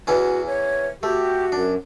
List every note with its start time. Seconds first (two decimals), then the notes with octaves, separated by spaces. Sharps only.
0.07 E2 E3 C#4 F#4
0.47 C#5
1.03 A3 F#4 G4
1.52 F#2 D4